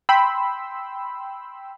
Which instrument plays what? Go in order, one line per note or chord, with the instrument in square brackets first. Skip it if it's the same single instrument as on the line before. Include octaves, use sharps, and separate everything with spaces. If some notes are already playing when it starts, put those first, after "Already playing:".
[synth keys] G5 B5 C6 E6